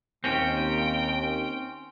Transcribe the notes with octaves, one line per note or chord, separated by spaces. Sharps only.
D#2 C4 C#4 G5